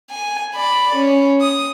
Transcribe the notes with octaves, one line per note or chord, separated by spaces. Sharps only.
G#5
D5 B5
C#4
D#6